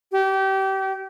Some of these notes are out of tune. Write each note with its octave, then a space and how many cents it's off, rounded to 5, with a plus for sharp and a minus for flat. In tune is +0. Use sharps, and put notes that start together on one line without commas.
G4 -30